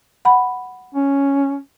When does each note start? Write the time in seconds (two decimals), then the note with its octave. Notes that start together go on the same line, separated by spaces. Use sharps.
0.25 F#5 B5
0.95 C#4